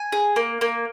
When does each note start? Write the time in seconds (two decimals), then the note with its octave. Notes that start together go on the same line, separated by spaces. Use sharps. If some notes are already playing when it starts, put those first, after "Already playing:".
Already playing: G#5
0.12 G#4
0.36 A#3
0.61 A#3